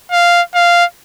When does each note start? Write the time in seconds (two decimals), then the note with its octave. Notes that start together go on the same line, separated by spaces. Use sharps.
0.12 F5
0.55 F5